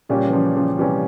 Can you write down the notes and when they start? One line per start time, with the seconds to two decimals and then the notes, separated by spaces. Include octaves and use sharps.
0.09 A#2 C#3 G3 C#4 G4
0.27 E3
0.33 C#3 F3
0.56 C#3 F3
0.79 C3 E3 G3 C#4 G4